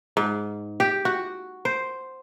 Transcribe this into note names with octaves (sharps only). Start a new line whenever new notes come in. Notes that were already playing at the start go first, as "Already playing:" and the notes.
G#2
G4
F#4
C5